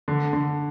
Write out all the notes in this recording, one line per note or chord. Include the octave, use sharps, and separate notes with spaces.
D3
D3